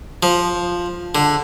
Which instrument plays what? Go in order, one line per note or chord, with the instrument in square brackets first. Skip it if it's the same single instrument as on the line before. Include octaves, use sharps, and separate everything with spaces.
[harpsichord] F3
D3